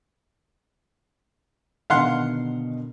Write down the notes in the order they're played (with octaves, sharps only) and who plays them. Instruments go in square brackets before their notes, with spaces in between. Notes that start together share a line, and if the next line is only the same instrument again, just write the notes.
[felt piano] B2 D3 D#3 [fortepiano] F5 F#5 C6